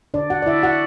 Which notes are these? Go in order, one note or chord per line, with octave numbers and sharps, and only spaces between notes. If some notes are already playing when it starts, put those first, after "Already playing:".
D3 D4 D5
F#4 F#5
D5
D3 E4 E5
F#4 F#5